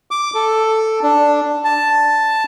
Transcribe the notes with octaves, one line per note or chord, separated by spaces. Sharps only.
D6
A4
D4
A5